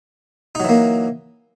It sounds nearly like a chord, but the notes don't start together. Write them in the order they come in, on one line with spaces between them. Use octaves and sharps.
D#4 F#3 E3 A#3